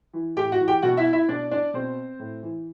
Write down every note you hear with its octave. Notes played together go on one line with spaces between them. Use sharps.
E3
A2 G4 G5
F#4 F#5
E3
G4 G5
B2 F#4 F#5
E4 E5
E4 E5
B2 D4 D5
D4 D5
B2 C4 C5
A2
E3